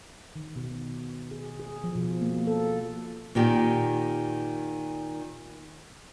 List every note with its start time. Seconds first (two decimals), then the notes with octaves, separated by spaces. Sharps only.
0.36 D#3
0.56 B2
1.31 G#4
1.60 G#4
1.84 F3
1.95 B2
2.22 A#3
2.47 A4
3.35 A#2 D#3 G4